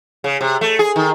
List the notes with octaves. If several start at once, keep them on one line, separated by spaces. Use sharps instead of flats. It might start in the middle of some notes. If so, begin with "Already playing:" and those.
C#3
C3
A3
G#4
D#3